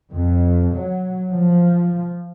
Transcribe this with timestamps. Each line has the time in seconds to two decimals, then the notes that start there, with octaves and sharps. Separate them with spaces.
0.12 F2
0.74 F#3
1.32 F3